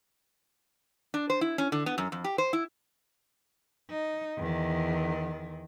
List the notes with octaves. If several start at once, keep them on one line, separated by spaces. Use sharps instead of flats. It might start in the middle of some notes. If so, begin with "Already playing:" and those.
D4
C5
E4
C#4
D3
B3
F#2
F2
G4
C5
E4
D#4
E2 D#3